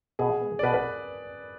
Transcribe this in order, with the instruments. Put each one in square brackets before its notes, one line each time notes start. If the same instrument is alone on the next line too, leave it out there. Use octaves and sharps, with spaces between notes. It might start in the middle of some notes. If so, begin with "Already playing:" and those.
[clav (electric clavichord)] B2 [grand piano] G#4
[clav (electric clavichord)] G#3 B3
[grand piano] D5
[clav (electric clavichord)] B2 [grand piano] B4
[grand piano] B4